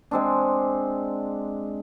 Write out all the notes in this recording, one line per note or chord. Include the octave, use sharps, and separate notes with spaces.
G#3 C4 D4